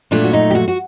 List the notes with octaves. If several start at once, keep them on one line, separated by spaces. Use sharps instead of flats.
A#2 F#3 A3 D4
F#4
D#4
G4
F#4
F#4